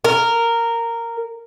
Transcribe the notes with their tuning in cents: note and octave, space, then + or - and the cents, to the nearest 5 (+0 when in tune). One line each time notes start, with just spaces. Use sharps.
A#4 -10